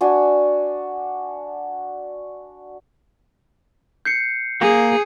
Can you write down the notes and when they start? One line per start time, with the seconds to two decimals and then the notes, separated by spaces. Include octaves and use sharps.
0.01 D4 F#4 G#5
4.05 G6 C7 C#7
4.61 A#3 G#4